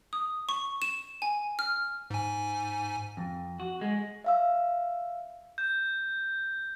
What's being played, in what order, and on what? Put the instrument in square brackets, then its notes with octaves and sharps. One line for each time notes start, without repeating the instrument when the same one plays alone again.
[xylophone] D#6
C#6
E7
G#5
F6
[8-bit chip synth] G#2 G#5
[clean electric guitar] F2
F#4
G#3
[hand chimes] E5 F5 E6
[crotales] G6